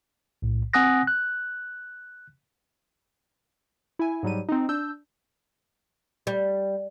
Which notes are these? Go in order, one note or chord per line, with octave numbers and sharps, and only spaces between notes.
B1 A2
C4 F#5 G#5 D#6 F#6 A#6
F#6
E4 G#5
G#2 F#3 G3 D#7
C4 D#4
D4 E6 G6
G3